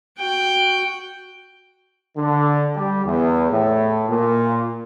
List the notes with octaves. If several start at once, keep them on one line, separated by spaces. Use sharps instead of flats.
F#4 G5
D3
G3
E2
A2
A#2